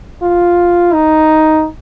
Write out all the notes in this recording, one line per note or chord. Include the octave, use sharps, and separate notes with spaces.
F4
D#4